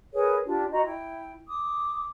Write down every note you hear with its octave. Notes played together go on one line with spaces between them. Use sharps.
G#4 A#4 B4 C#5
D4 F4 G4
F#4 C5 D#5 A#5
E4 G5
D6 D#6